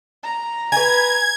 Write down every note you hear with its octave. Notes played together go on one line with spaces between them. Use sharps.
A#5
B4 G#5 G#6